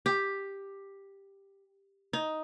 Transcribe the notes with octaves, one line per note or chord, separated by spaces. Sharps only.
G4
D#4